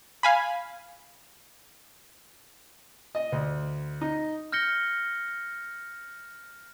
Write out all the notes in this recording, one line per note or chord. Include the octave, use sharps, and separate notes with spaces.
F5 G#5 B5
D#5
D2
D#4
F6 G6 A#6 C#7 G7